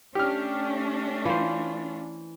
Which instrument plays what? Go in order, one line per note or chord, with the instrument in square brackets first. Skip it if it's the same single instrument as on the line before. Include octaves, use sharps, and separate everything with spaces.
[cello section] A3 C#4 D4 [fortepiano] G4 F6
[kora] E3 C5 [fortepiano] F4